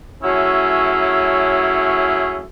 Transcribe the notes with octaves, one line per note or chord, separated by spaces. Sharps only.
F#3 A3 C#4 E4 G#4